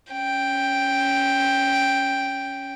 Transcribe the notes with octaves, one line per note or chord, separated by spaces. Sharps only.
C#4 G5